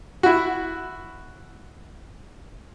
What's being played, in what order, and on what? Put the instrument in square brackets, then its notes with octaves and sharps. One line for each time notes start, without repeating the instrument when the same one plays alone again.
[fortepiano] E4 F#4